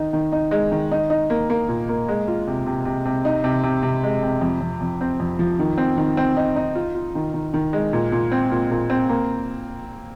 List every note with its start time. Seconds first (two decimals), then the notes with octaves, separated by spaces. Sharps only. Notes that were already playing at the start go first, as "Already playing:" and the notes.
Already playing: D#3 D#4
0.13 D#3
0.32 D#4
0.51 G#3
0.71 D#3
0.92 D#4
1.10 D#4
1.30 A#3
1.50 A#3
1.68 A#2
1.89 A#3
2.08 G#3
2.28 F4
2.47 C3
2.66 C3
2.85 C3
3.06 C3
3.25 D#4
3.44 C3
3.63 C3
3.83 C3
4.03 G#3
4.23 C3
4.41 F2
4.61 F2
4.81 F2
5.01 C4
5.20 F2
5.39 F3
5.59 D#3
5.78 C4
5.97 D#3
6.17 C4
6.37 D#4
6.56 D#4
6.75 F4
6.95 F4
7.15 D#3
7.34 D#3
7.54 D#3
7.73 G#3
7.93 A#2
8.12 A#2
8.32 C4
8.51 A#2
8.71 A#2
8.90 C4
9.09 A#3